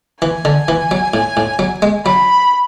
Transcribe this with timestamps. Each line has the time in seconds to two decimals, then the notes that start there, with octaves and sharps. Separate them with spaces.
0.22 E3 G#5
0.45 D3
0.68 E3
0.91 F#3
1.14 A2
1.37 A2
1.59 F#3
1.82 G#3
2.05 F#3 B5